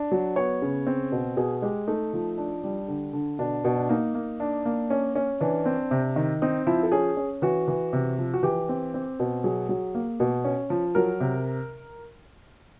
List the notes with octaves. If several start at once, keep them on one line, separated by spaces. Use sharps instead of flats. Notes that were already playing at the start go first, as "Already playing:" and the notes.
Already playing: D4
F#3
B3 C#5
C#3
C4
B2
B2 G#4
G#3 G4
A3 D#4
F3
D4
G3
D3
D3
B2 D4
B2
D4
A#3 D#4
A#3
D4
A#3
C#4
C#4
E3 D4
C4
C3
D#3
C4 D#4
F3 E4
A4
C#4 G#4
C#4
E3 F#4
E3
C3
F3
F#4
E3 G4
C4
C4
B2
F#3 G#4
F#3
A#3
B2
C#4
F3
F#3 A#4
C3